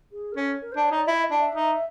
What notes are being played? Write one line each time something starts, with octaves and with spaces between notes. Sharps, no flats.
G#4
A#4
C#4 A4
A#4
C5
D4
C#5
D#4 D5
E4 E5
E5
D#5
D4
E5
D#4